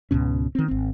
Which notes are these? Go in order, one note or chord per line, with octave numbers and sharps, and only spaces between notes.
C#2 G#2 B2 C#4
D#3 C4
G#1 C4